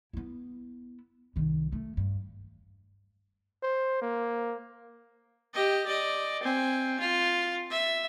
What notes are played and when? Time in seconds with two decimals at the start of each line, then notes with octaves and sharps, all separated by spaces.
0.13 B3 E4
1.36 C2 D#3
1.72 A3
1.97 G2
3.62 C5
4.02 A#3
5.54 G4 D#5
5.87 D5 D#5
6.43 C4 G#5
7.00 F4
7.70 E5